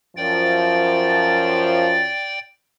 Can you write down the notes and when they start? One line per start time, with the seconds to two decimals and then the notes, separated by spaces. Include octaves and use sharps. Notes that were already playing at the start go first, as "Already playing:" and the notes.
0.17 F#2 F3 D5 G5 A6